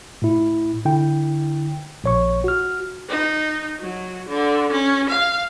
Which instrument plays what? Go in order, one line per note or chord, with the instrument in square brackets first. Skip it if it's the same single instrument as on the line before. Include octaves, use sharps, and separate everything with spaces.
[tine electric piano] A2 E4
D3 E4 G5
A#1 C#5 C#6
F#4 F6
[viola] D#4
F#3
D3
C#4
F5